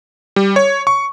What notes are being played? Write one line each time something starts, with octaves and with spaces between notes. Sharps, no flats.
G3
C#5
C#6